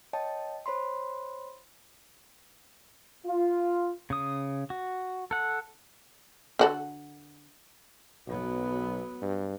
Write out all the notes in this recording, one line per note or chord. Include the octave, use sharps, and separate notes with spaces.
C#5 D#5 G5 A5
C5 C#5 B5 C6
F4
C#3 D#6
F#4
A4 F#5
D3 F#4 A4
B1 F#3 B3
G2